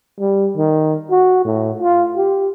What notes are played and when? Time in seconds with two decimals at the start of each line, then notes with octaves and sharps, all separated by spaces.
0.19 G3
0.57 D#3
1.11 F#4
1.45 A2
1.81 F4
2.17 G4